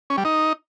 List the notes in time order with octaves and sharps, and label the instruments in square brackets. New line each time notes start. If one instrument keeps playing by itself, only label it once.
[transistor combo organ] C#4
G3
D#4